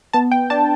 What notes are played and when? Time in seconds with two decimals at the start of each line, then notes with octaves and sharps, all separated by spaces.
0.13 B3 A5
0.32 G5
0.50 D4 A5